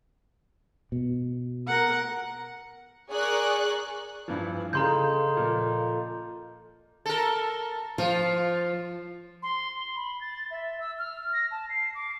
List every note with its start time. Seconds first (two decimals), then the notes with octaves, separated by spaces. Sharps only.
0.92 B2
1.68 A#4 F#5
3.10 G#4 A#4 D5 C#6 F#6
4.28 G2 E3 F3
4.73 C#3 G#4 A4 D#5 F5 A#5 C6 G6
5.37 A#2 F3
7.06 A4 A#4
7.98 F3 F4
9.43 C6
9.80 G7
9.95 B5
10.21 A6
10.51 E5
10.81 E6
10.99 F6
11.33 A#6
11.51 A5
11.70 C7
11.95 D6